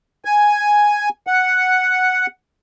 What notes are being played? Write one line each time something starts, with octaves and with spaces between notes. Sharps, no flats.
G#5
F#5